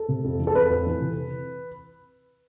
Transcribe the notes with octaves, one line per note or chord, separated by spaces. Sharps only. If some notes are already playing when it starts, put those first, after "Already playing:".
Already playing: A4
C3
F2
E3
A4
F2 B4
F2
E3
C3